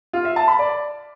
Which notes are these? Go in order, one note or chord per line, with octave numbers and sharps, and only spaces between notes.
F4
E5
A5
B5
D5